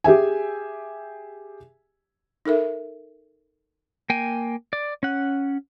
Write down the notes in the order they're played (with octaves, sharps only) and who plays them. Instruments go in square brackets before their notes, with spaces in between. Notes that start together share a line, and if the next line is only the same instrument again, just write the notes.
[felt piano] G4 G#4 E5 G#5
[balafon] D#4 A4 A#4 E5
[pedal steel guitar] A#3 G5 G#5
D5
C#4 F#5